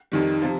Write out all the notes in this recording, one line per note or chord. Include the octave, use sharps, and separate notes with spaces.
F2 D#3 G3
C3 F3